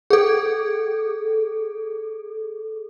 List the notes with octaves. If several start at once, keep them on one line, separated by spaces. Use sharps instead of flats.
G#4 A4